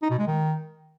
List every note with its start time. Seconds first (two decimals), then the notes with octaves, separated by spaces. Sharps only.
0.02 D#4
0.10 B2
0.19 G#3
0.27 D#3